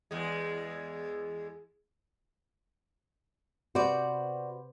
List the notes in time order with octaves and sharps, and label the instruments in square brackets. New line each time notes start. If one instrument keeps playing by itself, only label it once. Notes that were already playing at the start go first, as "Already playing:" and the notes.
[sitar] E2 G#3
[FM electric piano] C3 B4 C5 [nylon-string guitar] F#4 D5